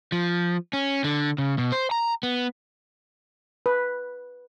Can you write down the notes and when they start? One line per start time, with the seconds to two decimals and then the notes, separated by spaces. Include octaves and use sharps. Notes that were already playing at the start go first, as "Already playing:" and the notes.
0.12 F3
0.73 C#4
1.04 D3
1.38 C#3
1.58 B2
1.72 C5
1.91 A#5
2.23 B3
3.66 B4